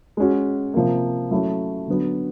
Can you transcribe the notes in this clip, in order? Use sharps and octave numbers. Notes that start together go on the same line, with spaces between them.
G#3 C#4 F#4
C3 F3 A#3
F#3 A3 C#4 E4
D3 F#3 B3